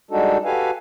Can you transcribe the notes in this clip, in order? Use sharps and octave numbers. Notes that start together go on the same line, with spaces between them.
G3 G#3 D4 D#4 F#4 A4
F#4 G4 A4 B4 F5 G#5